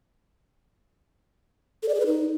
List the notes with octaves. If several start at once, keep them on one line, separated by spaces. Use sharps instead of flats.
A4
D5
G#4
B4
D#4